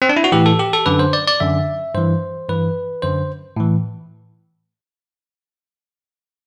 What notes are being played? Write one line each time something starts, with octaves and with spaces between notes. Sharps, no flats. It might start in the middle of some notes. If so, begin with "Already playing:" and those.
C4
D4
E4
F#4
A2 E3 G4
A4
G4
A4
F#2 D3 B4
C5
D5
D5
F#2 D3 E5
G2 E3 C5
G2 E3 B4
F#2 D3 C5
A2 E3